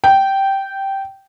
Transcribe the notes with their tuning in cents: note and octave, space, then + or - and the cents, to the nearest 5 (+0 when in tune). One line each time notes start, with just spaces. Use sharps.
G5 -10